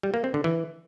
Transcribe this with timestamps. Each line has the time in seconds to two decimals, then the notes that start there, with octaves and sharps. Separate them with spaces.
0.03 G3
0.14 A#3
0.24 C4
0.34 D3
0.44 E3